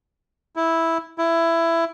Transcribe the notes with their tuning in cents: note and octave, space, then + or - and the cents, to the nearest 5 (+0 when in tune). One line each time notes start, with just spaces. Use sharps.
E4 -5
E4 +15